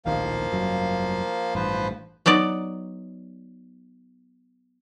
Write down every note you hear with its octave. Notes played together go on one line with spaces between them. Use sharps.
D1 A#1 D#3 F3 A#3 F5
F1 G2 F#3
A1 G2 F3 B4 C5
F#3 B3 D#4 D5